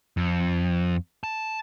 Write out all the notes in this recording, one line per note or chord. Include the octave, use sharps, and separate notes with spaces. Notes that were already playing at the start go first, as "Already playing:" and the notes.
F2
A5